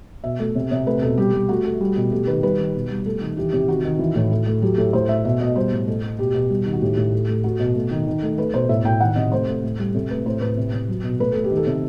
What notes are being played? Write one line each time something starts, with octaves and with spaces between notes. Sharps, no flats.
B2 E5
A3
C3
C3
A3 B4
B2 A4
G3 G4
G3
A3 F#4
A3
G3
B2
A3 G4
D#3 B4
G3 B4
D#3
B2
G3
A3 A4
D#3
E3 G4
C3 G4
D#3 F#4
D#3
E3
A2
A3
A3
F#3 G4
A2 A4
A2 C5
A3 E5
B2 E5
B2 D#5
G3 C5
A2
A3
A3
B2 G4
B2 F#4
G3
D#3
F#4
A2 G4
A2
A3
A3
A3 F#4
B2
A3
D#3
D#3
A3
A3 B4
B2 C5
A2 E5
A2 G5
D#3 F#5
C3 D#5
A3 C5
A3
A2
G3
C3 A4
A3 B4
A2 C5
A2 B4
C3
C3
F#3
B2
A3 B4
A3 A4
G4
D#3
A4
C3